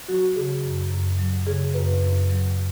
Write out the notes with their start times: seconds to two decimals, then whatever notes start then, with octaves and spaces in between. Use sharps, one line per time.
0.08 F#3 F#4
0.36 C#3 G#4
0.63 F#2
0.91 F#2
1.19 F#3
1.47 C#3 G#4
1.74 F#2 B4
2.01 F#2
2.29 F#3